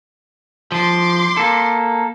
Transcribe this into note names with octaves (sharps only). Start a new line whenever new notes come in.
F3 C6 D6
A#3 A4